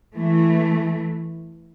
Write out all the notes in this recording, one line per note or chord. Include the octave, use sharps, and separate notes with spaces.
E3 A3